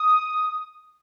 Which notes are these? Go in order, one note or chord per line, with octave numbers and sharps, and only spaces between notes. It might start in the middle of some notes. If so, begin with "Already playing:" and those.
Already playing: D#6